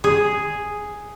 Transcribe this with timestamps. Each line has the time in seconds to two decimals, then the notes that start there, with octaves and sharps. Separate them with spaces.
0.04 G#4